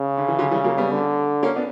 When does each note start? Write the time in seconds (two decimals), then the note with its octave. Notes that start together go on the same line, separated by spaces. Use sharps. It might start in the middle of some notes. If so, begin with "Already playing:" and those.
Already playing: C#3
0.18 D3
0.28 E3
0.38 D3 F#3
0.51 E3 G3
0.64 F#3 A#3
0.77 G3 B3
0.91 D3
1.43 A#3 C#4
1.56 B3 D4